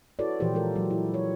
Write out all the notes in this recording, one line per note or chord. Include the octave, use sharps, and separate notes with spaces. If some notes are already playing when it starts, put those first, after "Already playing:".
E4 F#4 A4 B4 C#5 D5
A#2 E3 F3 G4 B4 C5
F3 G#3 F4 A4 A#4
F#3
E4
C#5